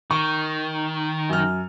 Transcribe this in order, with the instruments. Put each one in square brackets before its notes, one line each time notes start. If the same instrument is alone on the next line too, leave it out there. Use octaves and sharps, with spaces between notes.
[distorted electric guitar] D#3 [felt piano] C#6
[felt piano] F#2 F6